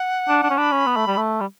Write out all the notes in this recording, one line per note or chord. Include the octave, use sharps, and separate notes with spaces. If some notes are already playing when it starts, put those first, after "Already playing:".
Already playing: F#5
D4
D4
C#4
D4 B5
C#4
B3
A3
G3
A3
G3